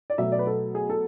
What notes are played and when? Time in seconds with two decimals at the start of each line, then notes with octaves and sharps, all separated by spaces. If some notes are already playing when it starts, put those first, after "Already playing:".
0.10 D5
0.18 B2 F#3 A3 E5
0.32 D5
0.39 B4
0.47 A4
0.75 G#4
0.90 A4